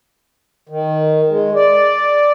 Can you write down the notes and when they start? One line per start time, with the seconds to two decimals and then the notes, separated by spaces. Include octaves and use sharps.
0.69 D#3
1.29 G#3
1.55 D5